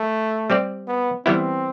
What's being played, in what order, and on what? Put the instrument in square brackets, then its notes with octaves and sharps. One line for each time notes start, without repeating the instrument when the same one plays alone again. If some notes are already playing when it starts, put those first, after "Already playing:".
Already playing: [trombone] A3
[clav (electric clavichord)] G3 C4 G4 D5
[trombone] B3
[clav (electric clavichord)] E3 G3 B3 E4 [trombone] C4